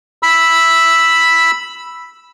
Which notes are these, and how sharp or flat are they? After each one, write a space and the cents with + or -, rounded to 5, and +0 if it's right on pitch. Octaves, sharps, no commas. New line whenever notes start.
B5 +0 E6 +0